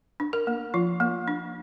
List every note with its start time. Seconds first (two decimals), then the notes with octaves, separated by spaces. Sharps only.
0.20 D4
0.33 A#4
0.47 A#3
0.74 F3 F4
1.00 A#3
1.28 D4